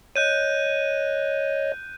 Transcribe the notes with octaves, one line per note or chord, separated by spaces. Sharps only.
C#5 D#5 F#6 G6 D#7